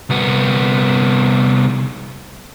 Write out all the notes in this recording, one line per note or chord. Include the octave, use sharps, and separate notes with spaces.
C2 B3